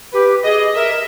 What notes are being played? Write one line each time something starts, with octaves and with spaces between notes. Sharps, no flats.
G4 B4
G#4 D#5
A#4 E5